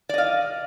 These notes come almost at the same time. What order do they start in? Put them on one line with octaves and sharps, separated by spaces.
D5 D#5 F5